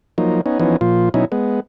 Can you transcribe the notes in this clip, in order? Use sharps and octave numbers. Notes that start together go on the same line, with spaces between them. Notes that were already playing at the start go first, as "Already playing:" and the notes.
F3 F#3 A#3 D#4
B3 C#4 D#4
E3 F3 B3 C#4 D#4
A#2 F3 F4
B2 F#3 C#4 D#4 E4
G#3 B3